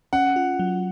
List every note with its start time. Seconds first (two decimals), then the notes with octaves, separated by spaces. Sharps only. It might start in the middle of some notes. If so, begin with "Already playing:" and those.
0.13 C#4 F#5
0.36 F4
0.59 F#3